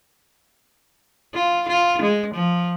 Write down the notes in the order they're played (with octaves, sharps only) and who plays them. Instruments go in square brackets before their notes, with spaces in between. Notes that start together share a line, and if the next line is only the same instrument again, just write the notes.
[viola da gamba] F4
F4
G#3
F3